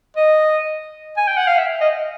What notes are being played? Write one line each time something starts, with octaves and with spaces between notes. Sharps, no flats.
D#5
G#5
G5
F#5
F5
E5
D#5